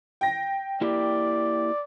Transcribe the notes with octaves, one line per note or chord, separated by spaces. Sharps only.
G5 A#6
A#3 E4 G4 D5